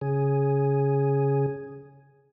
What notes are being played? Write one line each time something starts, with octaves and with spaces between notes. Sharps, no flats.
C#3 G#4